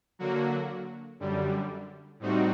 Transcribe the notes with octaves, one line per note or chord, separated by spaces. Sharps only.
D3 F#3 A#3 F#4
F#2 D3 G3
A2 G3 C4 D#4 F#4